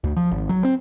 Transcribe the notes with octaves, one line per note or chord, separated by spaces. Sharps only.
D2
F3
G#1
F#3
C4